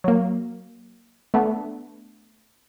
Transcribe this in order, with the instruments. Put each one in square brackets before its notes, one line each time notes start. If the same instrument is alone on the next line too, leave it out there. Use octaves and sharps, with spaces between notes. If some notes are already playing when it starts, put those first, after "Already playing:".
[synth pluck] F#3 A#3
A3 B3 D4